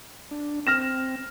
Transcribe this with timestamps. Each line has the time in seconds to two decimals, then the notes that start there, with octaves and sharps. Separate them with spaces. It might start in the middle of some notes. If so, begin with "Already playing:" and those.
0.31 D4
0.67 C4 F6 A#6 E7